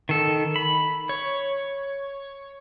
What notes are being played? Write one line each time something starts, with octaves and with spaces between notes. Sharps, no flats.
D#3 A4
B5
C#5